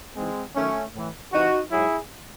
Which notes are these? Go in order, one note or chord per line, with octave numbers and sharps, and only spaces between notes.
G#2 E3 G#3 C4
F#2 D#3 F#3 A3 C#4
A2 E3
C3 E3 D#4 F#4
G#2 F#3 E4 G#4